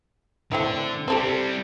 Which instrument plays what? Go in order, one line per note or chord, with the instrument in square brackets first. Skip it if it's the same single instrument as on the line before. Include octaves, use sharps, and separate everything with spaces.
[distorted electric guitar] D3 [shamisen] A3 C4 E4
[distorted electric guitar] G3 C4 [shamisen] G4 A4 C5